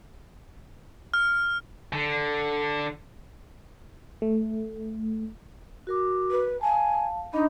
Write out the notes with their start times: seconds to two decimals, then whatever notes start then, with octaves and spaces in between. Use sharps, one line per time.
1.14 F6
1.93 D3
4.22 A3
5.87 F#4 A#4 D6
6.31 B4
6.61 F5 G#5 A5
7.33 D4 D#4 D#5 B5